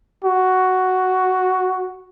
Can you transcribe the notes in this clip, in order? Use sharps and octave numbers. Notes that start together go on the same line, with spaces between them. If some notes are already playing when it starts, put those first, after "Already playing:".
F#4